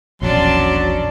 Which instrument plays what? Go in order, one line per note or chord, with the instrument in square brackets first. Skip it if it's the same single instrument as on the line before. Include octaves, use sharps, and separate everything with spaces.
[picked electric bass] E1 A#1 [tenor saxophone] F#3 [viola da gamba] C#4 D4 D5 [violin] A5 C6